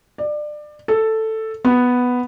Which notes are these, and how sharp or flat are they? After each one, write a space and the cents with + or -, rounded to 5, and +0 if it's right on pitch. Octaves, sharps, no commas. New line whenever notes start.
D5 +25
A4 +5
B3 +0